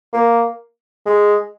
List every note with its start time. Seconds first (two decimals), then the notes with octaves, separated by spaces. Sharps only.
0.13 A#3
1.06 G#3